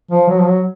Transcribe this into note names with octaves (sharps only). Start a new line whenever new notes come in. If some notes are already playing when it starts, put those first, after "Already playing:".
F3
F#3
F3
F#3